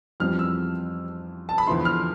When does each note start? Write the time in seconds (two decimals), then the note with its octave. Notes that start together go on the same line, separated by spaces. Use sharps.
0.20 F2 E3 G3 C4 F4 F6
0.39 E6
1.49 A5
1.58 B5
1.67 E2 D3 F3 B3 E4 C6
1.85 F6